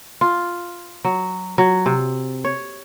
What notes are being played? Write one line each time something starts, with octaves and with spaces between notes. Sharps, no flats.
F4
F#3
F#3
C3
C#5